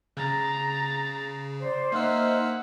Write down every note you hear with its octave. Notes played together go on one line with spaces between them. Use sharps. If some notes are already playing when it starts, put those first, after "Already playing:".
C#3 A#5 A6
C5 D5
A#3 D#4 C5 E5 F#5 E6 F6